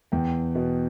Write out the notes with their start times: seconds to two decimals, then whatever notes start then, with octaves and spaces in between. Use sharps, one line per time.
0.12 E2 G5
0.55 B2